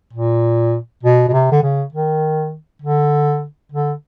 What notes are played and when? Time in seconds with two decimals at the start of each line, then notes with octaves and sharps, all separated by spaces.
0.13 A#2
1.03 B2
1.28 B2
1.33 C3
1.52 D3
1.63 C#3
1.93 D#3
2.82 D3
3.72 D3